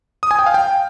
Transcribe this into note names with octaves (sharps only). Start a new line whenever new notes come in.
D#6
G#5
G5
F5
G5